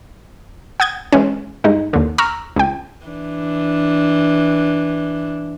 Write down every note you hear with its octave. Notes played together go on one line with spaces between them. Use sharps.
F#5 D#6 G6 G#6
E3 G#3 C#4
G2 G#3 D#4
D#2 D3
A#5 C#6 E6 F6
C#2 G5
E3 D4